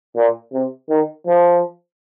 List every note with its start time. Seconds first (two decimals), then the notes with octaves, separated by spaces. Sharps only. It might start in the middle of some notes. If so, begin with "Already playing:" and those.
0.16 A#2
0.53 C3
0.89 D#3
1.27 F3